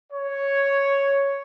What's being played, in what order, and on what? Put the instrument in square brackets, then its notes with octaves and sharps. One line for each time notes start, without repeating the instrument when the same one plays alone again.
[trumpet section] C#5